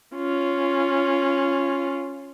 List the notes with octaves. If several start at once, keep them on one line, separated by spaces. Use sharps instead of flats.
C#4 F4